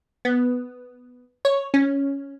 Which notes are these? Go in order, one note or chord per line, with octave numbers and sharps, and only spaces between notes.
B3
C#5
C#4